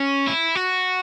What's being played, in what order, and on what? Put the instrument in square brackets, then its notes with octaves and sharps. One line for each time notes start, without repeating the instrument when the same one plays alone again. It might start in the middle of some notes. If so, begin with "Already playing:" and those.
Already playing: [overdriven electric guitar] C#4
E4
F#4